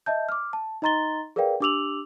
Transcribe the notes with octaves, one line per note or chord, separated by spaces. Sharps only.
D#5 E5 A5 G6
D6 F6
A5
D#4 D#5 A#5 C6 A6 G7
G#4 A#4 B4 D5 F5 G5
D4 G4 D6 E6 F7 F#7